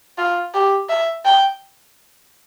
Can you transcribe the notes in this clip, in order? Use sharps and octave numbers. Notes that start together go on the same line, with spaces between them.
F4
G4
E5
G5